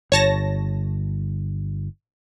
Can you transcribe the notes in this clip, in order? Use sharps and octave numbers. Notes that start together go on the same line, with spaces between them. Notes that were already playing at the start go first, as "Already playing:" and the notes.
G1 C#5 A5 A#6